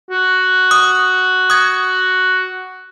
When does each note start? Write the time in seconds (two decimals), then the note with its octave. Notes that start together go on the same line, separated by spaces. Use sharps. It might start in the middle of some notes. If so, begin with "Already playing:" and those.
0.11 F#4
0.71 D#6
1.50 D#6 G#6